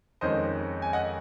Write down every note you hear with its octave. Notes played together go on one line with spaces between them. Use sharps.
F2 D#3 G#3 C#4 C5 D#5
G#5
D#5 F#5